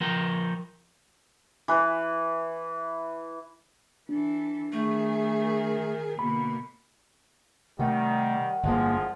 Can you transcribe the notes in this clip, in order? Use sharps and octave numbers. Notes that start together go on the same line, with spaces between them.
F3 A#4 G5
E3 B4
E3 D4 A4
D#3 A3 G#4
A#4
B2 D3 A#3 B5
C3 D#3 G3 A3 F#5
G1 C2 F2 F3 G#3 A#3